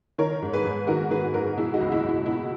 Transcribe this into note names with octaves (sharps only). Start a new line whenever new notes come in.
D#3 A#4 C#5
G#2
G#4 B4
G#2
D#3 F#4 A#4
D#3 G#4 B4
G#2 F#4 A#4
B2 E4 G#4
D#4 F#4
C#2
E4
C#2
E4
B2 E4